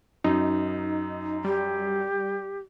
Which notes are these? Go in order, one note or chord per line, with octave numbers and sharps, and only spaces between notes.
F#2 D#4
G3 G4